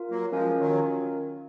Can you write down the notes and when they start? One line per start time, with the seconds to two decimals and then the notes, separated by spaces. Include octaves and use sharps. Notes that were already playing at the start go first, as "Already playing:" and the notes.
Already playing: F4 A#4 F5
0.11 F#3 A#3
0.32 F3 G#3 C#4 F4 A#4 F5 G#5
0.60 D#3 F#3